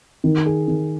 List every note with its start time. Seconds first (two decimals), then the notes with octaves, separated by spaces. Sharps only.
0.24 D#3
0.46 G#4
0.68 D#3